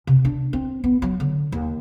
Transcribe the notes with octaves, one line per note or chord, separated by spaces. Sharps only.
C3
D4
C4
B3
F#3
D3
D#2